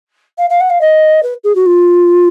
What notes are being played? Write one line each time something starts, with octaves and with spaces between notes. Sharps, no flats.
F5
F5
F#5
F5
D#5
B4
G#4
F#4
F4